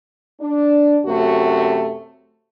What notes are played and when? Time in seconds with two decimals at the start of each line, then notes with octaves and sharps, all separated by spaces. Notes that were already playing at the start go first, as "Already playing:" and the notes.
0.41 D4
1.06 F#2 C3 A3 F#4